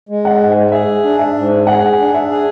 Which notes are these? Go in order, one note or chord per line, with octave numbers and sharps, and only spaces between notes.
G#3
F#5
G#2
G#4 E5
D4
E5
G#2
G#4 F#5
D4
E5
G#4